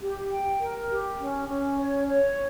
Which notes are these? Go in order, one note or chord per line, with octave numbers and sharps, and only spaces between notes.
G4
G5
A#4
G4
C#4
C#4
C#5
C#5